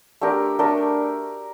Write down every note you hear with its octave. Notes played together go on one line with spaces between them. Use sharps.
A3 D4 G4 A#4
A3 D4 G4 A#4